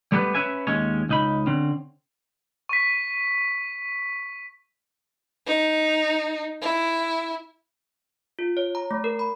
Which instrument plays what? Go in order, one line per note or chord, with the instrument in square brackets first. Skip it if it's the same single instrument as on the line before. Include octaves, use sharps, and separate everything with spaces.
[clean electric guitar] G3 A3 B3 G4 G#4 B4
C#4 B4 E5 G#5
D#2 G#3 C#4 C#5
C#2 D#4 B5
D3 C4 C#4
[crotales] C#6 B6
[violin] D#4
E4
[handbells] F4
C#5
A#5
A3
A#4
B5